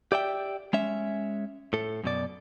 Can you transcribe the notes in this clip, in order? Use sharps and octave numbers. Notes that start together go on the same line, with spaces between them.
G4 D5 E5 G5
G#3 C#4 E5
A2 A4
F#2 B2 D5